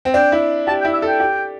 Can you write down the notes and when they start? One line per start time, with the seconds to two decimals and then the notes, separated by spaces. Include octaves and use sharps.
0.05 C4
0.14 D4 G5
0.32 E4
0.67 G4 A5
0.80 G5
0.85 E4
0.93 E5
1.02 A4
1.07 G5
1.20 G4